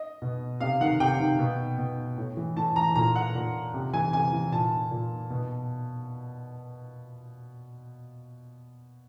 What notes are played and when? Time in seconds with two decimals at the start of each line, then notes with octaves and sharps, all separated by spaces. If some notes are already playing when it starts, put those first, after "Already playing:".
Already playing: D#5
0.22 B2
0.60 C3 F5
0.81 D#3 F#5
1.00 C3 G5
1.20 D#3
1.39 B2
1.78 B2
2.17 A2
2.37 E3
2.56 A2 A5
2.76 E3 A#5
2.96 A#2 A#5
3.16 F#5
3.35 A#2
3.74 C3
3.93 E3 G#5
4.13 C3 G#5
4.32 E3
4.52 A#2 A5
4.91 A#2
5.30 B2